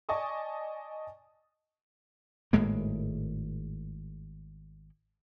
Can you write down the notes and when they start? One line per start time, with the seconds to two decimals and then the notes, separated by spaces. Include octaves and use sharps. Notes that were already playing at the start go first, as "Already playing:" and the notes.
0.09 D5 D#5 G#5 A5 C#6 D#6
2.53 G#1 A2 G#3 A#3